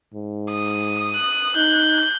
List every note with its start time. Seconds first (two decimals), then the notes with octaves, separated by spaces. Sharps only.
0.14 G#2
0.51 D#6
1.16 F#6
1.56 D#4 G6